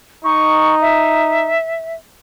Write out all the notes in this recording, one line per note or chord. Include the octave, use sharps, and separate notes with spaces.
D#4 C#6
E5